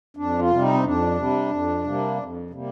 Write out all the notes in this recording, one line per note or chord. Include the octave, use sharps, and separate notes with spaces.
F2 D4
F4
C3 G3
D#4
C4
F2 D4
C3 G3
F2
C3 G3 A#3
F2
C3 G3 A#3